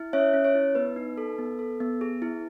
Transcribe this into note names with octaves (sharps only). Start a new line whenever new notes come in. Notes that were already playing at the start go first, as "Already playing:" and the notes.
Already playing: E4
C#4 C#5 E5
C#4
C#5
E4
B3 B4
D#4
A4
B3
A4
B3
G#4
E4